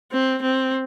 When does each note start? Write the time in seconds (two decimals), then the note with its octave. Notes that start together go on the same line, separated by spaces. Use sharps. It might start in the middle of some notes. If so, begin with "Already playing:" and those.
0.12 C4
0.42 C4